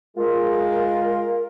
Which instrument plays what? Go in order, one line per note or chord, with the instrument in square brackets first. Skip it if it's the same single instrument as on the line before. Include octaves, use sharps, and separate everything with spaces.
[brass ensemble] G#3 [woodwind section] F4 A#4